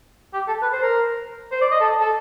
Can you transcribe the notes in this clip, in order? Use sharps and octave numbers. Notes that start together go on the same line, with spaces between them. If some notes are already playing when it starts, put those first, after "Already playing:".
G4
A4
B4
C5
A#4
C5
D5
D#5
A4
A4